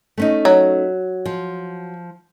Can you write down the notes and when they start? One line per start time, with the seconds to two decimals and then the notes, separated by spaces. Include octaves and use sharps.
0.18 A3 C#4 D#4
0.45 F#3
1.26 F3